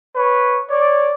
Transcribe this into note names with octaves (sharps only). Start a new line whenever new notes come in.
B4 C#5
C#5 D5